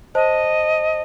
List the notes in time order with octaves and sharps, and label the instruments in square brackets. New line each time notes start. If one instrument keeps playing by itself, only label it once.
[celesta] C5 A5 [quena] D#5